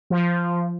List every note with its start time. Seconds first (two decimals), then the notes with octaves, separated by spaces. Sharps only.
0.10 F3